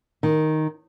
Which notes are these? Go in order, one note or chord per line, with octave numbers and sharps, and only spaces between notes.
D#3